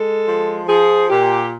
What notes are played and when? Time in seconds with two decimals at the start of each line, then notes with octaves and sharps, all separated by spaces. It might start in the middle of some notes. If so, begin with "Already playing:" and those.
Already playing: G#3 A4
0.28 F3
0.69 F3 G#4
1.10 A#2 G4